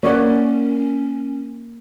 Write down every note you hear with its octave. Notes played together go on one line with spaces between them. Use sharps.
A#3 C#4 C#5 D5 F#5